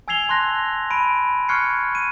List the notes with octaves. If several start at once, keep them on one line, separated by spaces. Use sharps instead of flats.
G#5 E6 G#6 C7 F7 G7
A5 C6 E6 F#6 A#6
B5 D7 D#7
C#6 F6 F#6 G#6 C7 C#7
D#7